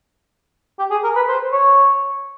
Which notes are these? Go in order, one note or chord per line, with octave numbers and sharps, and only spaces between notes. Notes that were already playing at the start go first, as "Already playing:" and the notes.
G4
G#4
A#4
B4
C5
C#5